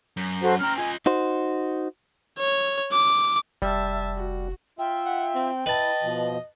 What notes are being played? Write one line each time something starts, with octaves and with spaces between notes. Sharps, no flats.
F#2
F#4 A4 C5
C#4 G5 A#5 F6
F4 D#5 G#5
D#4 F#4 C5
C#5
D6
F1 G3 E5 A5
F#4
F4 E5 G5
F#5
C4
E4 B4 D#5 A5
B2 F3